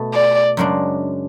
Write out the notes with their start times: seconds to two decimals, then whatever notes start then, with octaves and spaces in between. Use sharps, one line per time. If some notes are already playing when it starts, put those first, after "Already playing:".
Already playing: B2 A3
0.14 D5
0.57 F#2 C#3 G#3 D4